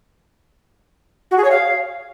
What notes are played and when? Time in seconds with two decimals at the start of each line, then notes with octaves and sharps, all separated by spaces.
1.31 F#4
1.38 G#4
1.44 C#5
1.51 F5